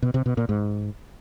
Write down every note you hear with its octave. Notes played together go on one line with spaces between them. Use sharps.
B2
C3
B2
A#2
G#2